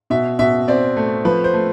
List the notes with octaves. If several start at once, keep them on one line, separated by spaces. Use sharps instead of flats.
B2 E5
B2 E5
C4 D5
A3
F3 B4
C5
A3